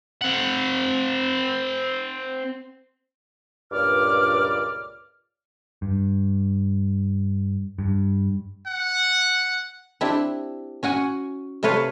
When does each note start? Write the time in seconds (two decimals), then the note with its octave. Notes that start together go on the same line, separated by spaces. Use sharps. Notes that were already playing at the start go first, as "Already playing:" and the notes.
0.22 C4 F#5
3.72 C#2 G2 A#2 D5 D6 F6
5.82 G2
7.79 G2
8.67 F#5
10.01 C4 D4 E4 G4
10.83 C#4 F#4 F#5 G#5
11.63 C3 A3 F4 B4 C#5 F5